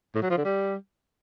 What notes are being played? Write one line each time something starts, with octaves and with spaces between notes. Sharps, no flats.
A2
F#3
F3
D3
G3